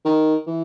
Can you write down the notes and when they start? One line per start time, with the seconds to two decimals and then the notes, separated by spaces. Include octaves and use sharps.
0.05 D#3
0.47 E3